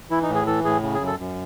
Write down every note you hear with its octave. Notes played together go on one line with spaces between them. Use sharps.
E3 E4
D#4
A2
G#4
E3 A4
A2 G#4
C#3
G#4
F#2
A4
F#2